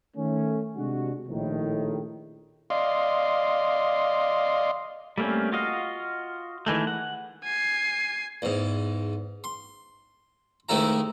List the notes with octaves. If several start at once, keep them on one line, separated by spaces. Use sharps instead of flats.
D#3 A3 C#4
C3 G#3 D4 F#4
A#1 A2 D#3
D5 D#5 F5 C6
G3 A3 A#3 C4 C#4
F4 F#4 D#5 F5
D#3 E3 G#3 A3
F#5
G#5 C7
E2 G#2
C6
C#2 C3 D#3 A3 E4 A#5